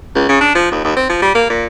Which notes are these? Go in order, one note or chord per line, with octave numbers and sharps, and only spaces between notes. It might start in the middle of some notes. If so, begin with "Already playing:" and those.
C#2
C#3
D4
F3
D#2
D#2
C4
F3
G3
A#3
A#2